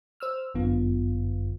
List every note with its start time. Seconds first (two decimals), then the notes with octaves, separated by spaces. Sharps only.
0.20 C5 E6 F6
0.54 G1 F#2 D3 B3 F4